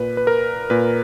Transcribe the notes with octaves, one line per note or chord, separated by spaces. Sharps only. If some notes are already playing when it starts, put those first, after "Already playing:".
Already playing: A#2 B4
B4
A#4
A#2 B4